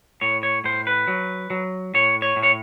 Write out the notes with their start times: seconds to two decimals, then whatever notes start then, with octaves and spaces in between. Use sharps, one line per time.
0.21 A2 C#5
0.43 C#5
0.64 A2 C5
0.87 B4
1.08 F#3
1.50 F#3
1.94 A2 C#5
2.22 C#5
2.36 A2
2.43 C#5